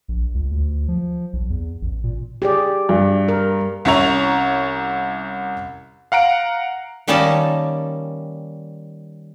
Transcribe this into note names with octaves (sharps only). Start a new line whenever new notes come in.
A#1
C#2
D2
F3
B1
E2
A1
A#2
G4 G#4 D5
G2
A#4
C2 C#4 E4 C#5 A#5 F7
F5 F#5 A#5 D7
D#3 G3 A#3 C#4 D#4 A5